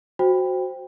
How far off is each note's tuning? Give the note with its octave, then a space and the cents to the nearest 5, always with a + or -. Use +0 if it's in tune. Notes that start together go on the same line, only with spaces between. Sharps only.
F#4 +0 C5 +0 G5 +15